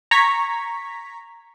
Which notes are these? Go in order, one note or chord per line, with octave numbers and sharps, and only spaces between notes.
A#5 C#6 G#6 B6